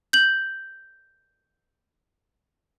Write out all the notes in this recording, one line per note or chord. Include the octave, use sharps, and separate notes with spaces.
G6 F#7